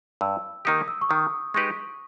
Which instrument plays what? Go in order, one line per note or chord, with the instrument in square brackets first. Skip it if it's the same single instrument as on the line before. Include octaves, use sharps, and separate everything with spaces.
[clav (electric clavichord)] G2 [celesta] E6
[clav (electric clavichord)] D#3 A#3 D#4 G4 [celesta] D#6
[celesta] E6
C#6
[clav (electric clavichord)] D#3 [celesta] D#6
[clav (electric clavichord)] G#3 D#4 G4 B4 [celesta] C#6